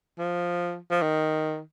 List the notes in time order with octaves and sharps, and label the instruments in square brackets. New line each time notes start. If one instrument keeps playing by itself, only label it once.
[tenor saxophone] F3
F3
D#3